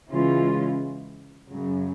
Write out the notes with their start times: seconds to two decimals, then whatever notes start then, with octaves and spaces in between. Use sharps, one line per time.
0.10 C#3 E3 G#3 C#4 F4
1.49 F#2 C#3 F#3